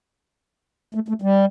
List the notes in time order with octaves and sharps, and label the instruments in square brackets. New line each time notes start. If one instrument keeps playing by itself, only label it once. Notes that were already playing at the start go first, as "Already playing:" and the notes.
[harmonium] A3
A3
G3